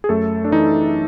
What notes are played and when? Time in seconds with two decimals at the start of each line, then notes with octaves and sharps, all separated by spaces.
0.04 G#4
0.09 F#2 A3 A4
0.44 D4
0.52 E3 D#4